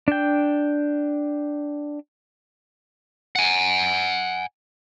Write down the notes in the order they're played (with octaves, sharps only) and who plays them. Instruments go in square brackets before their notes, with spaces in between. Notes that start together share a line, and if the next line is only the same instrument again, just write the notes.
[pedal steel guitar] D4 G5
[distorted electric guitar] F#5 G#5